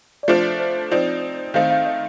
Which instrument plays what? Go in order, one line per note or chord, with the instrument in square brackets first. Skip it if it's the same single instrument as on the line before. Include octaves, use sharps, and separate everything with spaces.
[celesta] D5
[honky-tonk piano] F3 A3 D4 F4 [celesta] C5
[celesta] C5
[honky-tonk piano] F3 C4 D#4 [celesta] D5
[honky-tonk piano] D#3 A3 C4 D#4 [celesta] F5
[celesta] F5
D#5